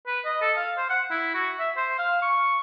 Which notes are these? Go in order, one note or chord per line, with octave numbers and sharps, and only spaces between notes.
B4
D#5
A4
F5
C5
F#5
E4
F#4
E5
C5
F5
C#6